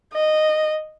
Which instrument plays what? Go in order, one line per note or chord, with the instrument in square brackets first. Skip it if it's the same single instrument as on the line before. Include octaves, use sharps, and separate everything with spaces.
[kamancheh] D#5